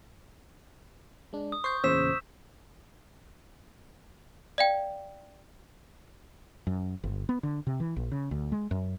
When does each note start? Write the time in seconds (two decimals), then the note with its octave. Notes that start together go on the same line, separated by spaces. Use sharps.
1.33 G#3 D4
1.52 D#6
1.64 C5 C#6 G6 C7
1.84 E2 A#2 C#3 C5 E6 B6 E7
4.58 D5 F5 G5
6.67 F#2
7.04 G1
7.29 B3
7.43 D3
7.67 C3
7.80 E3
7.96 A#1
8.12 C#3
8.31 D2
8.52 G#3
8.71 F#2